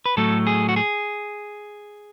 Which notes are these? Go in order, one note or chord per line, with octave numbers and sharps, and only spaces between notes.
B4
A2 F#3 A3 A4
G#4
F#4
G#4